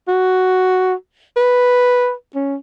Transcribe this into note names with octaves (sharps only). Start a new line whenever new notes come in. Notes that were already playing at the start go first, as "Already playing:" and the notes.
F#4
B4
C#4